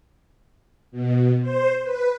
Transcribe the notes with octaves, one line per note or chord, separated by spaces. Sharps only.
B2
C5
B4